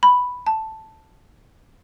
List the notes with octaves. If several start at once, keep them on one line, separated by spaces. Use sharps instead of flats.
B5
A5